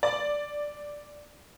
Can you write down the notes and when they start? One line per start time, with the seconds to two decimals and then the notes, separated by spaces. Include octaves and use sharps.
0.03 D5